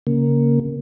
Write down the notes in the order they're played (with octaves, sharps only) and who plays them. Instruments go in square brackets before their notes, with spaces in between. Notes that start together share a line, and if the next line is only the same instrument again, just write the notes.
[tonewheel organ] C#3 A#3